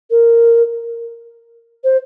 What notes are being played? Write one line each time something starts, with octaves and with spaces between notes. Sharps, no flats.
A#4
C5